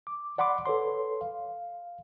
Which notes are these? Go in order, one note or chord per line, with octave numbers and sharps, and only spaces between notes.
D6
D5 F#5 B5 C6 D6
A4 B4 C#5 C6
F5